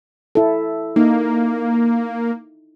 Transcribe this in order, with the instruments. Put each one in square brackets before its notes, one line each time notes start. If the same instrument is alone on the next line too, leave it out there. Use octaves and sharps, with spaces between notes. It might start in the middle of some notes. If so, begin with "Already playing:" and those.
[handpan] E4 A4
[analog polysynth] A#3 [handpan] D#4